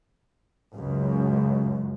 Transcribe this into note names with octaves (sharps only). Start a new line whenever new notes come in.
C#2 F#2